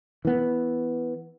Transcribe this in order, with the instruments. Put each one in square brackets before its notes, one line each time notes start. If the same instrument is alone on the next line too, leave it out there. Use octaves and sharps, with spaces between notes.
[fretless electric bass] E3 B3